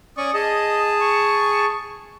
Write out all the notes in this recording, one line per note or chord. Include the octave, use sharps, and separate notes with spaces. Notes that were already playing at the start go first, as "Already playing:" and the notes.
C#4 D5 C#6 D#6
G#4 D#5 A5
C#6